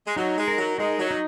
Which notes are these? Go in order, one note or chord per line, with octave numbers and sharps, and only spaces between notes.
G#3
F#3 D#4
G#3
A#4
F#3
G#3 D#4
F#3
D#4